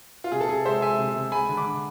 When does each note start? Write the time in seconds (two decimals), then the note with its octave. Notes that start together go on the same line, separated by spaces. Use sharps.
0.24 F4
0.32 C3 G#4
0.41 A4
0.49 C3 G#4
0.65 G#3 C5 E5
0.82 G#3 E5 G#5
0.99 C3
1.16 C3
1.32 G#3 G#5 B5
1.49 D3
1.57 B5 D6
1.66 D3